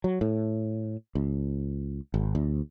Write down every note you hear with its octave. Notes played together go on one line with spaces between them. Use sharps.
F#3
A2
C#2
G#1
D2